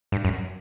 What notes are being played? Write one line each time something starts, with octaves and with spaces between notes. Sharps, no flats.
G2
F#2